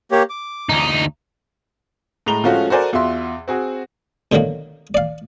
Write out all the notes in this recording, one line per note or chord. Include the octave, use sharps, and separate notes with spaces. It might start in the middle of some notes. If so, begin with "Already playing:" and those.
A#3 G4 C#5
D6
D2 D#4
A2 G#3 A#5 F7 G7
F3 G#3 A3 C#4 F4 F#4
F#4 A4 A#4 C5 D5 G#5
E2 F4 F#4 E5 C6
C4 F#4 G#4
B2 D3 D#3 F#3 A#3
D5 F5